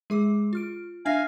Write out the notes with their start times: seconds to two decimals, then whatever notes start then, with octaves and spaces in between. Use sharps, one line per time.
0.10 G#3 G#4 D6
0.53 F4 F6 D7
1.06 D4 E5 F5 G#5 A#6